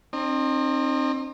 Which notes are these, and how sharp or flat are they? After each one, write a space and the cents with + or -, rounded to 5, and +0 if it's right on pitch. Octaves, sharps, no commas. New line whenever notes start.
C4 +25 D#4 -35